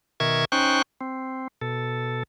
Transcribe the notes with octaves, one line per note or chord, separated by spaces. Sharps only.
B2 D#3 A#4 E5 C#6 G#6
C#4 D#4 C5 G5 C#6 F#6
C4
B2 A4